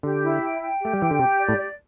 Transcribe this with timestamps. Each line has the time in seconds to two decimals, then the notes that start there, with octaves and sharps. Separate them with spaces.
0.03 D3 G4
0.22 E4
0.41 G5
0.61 G5
0.81 A3 G4
0.94 G3
0.99 E3 G5
1.11 D3
1.19 C3 G4
1.39 D5
1.49 A2
1.58 D5